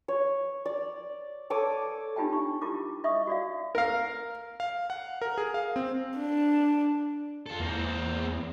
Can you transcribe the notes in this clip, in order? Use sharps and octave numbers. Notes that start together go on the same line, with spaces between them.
C#5
D5
A4 C#5 D6 D#6
D4 D#4 F4 G4 G5 A5
C#6
E4 F4 G4 A#4 D6
D#5 E5 C#6 D#6
F#4 D5 F5
A#4 F5
F5
F#5
A#4
G#4
F5
C4
D4
F4 A4
E2 A#3 C4